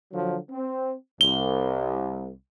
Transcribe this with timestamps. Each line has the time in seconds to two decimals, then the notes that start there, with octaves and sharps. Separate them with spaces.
0.13 D3 F3 F#3
0.51 C4
1.21 C2 G7